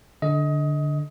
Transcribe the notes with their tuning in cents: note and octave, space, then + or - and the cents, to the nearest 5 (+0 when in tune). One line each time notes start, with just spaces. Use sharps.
D3 +0 D#5 +25